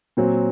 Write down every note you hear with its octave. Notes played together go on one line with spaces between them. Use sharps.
A#2 F#3 C4